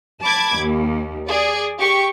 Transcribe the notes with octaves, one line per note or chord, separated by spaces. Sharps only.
A5 B5 D6 G#6
D#2
G#4 D5
G4 C#6